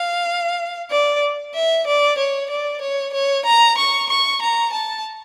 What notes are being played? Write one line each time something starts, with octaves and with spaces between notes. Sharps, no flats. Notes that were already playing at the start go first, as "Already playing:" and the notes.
Already playing: F5
D5
E5
D5
C#5
D5
C#5
C#5
A#5
C#6
C#6
A#5
A5